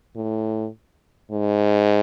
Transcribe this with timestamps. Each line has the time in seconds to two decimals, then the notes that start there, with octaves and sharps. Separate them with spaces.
0.16 A2
1.31 G#2